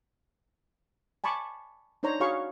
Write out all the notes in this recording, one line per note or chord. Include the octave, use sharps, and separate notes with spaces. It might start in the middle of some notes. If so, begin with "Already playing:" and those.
G#5 A5 B5 C#6 D6
D4 D#4 C5 C#5 A#5 C6
F#4 G#4 C#5 F5 B5 C#6